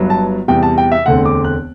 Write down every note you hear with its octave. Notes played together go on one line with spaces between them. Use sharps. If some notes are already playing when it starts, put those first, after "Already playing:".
Already playing: G1 G2 F#3
A5
E2 C3 G3 G5
A5
G5
E5
E1 D2 D3 A3 C4 F#5
D6
F#6